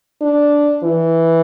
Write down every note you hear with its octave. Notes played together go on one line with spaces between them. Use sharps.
D4
E3